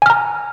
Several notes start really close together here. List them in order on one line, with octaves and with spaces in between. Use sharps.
G#5 F6 A#5